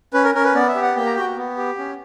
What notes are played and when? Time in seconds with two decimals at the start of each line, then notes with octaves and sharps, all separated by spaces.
0.14 C#4 B4
0.24 A#4
0.35 C#4 A#4
0.45 B4
0.55 B3 D5
0.68 E5
0.75 G4
0.82 F#5
0.96 A#3 G5
1.06 A#5
1.16 F#4 G5
1.37 B3
1.57 G4
1.78 C#4